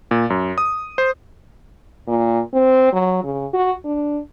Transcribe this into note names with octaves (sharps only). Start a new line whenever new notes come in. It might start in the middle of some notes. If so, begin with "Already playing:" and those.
A#2
F#2
D#6
C5
A#2
C4
F#3
C#3
F#4
D4